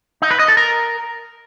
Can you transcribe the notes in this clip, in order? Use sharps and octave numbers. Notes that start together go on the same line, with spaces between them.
D#4
B4
D#5
A4
A#4